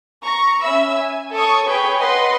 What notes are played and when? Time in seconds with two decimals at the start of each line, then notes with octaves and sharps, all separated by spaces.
0.23 A#5 C#6
0.63 C#4 E5 B5 E6
0.96 G#5
1.32 A4 C#5 C#6 D#6
1.67 G#4 B4 C#5 G5 B5
1.99 B4 D#5 F#5 C6